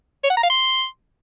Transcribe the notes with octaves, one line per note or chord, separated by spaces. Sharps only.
C#5
F#5
A#5
F5
C6